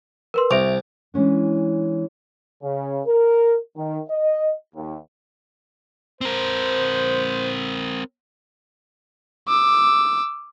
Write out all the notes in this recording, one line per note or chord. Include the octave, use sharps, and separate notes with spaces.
A#4 B4 C6
C2 E5 D7 F7
E3 G#3 C#4 D4
C#3
A#4
D#3
D#5
D#2
C4 A#4 C5
D6 E6